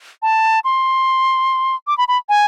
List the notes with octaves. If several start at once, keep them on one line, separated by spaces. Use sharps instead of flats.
A5
C6
D6
B5
B5
G#5